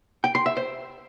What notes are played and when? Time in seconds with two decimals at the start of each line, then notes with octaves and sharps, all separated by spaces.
0.24 G5
0.35 C6
0.46 E5
0.57 C5